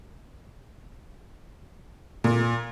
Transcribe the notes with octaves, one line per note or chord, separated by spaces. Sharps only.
A#2